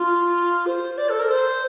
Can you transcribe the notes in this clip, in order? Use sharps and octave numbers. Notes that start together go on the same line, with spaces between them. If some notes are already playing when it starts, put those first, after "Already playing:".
Already playing: F4
C5
D5
A4
A#4
C5